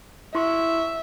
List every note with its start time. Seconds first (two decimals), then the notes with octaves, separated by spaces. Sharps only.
0.35 E4 E5 C6 C#6